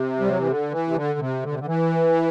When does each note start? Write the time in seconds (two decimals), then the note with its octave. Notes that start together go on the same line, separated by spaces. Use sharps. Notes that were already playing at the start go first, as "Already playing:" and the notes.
Already playing: C3
0.20 G3
0.29 F#3
0.39 E3
0.48 D3
0.72 E3
0.88 C3
0.95 D3
1.19 C3
1.43 D3
1.52 C3
1.59 D3
1.67 E3